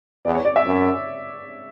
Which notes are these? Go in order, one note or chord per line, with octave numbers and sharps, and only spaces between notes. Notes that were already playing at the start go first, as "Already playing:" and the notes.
E2 D5
C#5
D5
E5
F#2